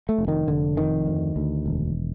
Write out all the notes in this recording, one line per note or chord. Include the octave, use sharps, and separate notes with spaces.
A3
F1
D#3
F1 D3
F2 D#3
D2
D2
E1